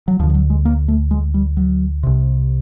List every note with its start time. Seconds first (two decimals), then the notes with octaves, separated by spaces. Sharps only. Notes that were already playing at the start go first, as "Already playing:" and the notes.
0.08 F#3
0.19 D2 F3
0.23 D3
0.30 F3
0.34 F#3
0.50 G#3
0.65 A#3
0.88 A3
1.11 G#3
1.34 G3
1.57 F#3
2.03 C2 C3